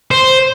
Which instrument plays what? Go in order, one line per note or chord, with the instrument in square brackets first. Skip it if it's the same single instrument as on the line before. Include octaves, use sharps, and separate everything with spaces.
[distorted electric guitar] C5